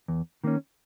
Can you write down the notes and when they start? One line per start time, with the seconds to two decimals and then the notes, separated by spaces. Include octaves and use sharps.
0.08 E2
0.44 D#3 A#3 C#4